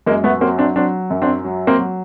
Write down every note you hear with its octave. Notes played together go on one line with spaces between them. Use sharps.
F#2 G#3 A#3
A3 B3
F#3 A#3 C4
C4 D4
F#3 C4 D4
F#2
C4 D4
F#3
A#3 C4
F#3